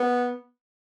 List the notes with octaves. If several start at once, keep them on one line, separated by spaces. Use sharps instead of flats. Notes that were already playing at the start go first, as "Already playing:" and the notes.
Already playing: B3